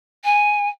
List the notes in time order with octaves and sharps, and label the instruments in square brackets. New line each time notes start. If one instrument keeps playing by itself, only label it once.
[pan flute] G#5